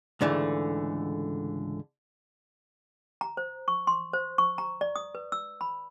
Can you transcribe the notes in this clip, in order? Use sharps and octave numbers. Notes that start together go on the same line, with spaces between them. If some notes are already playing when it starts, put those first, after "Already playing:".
C#2 G#2 D3 E3 A3
A#5
C5
C#6
C6
C5
C#6
A#5
D5
D#6
B4
E6
B5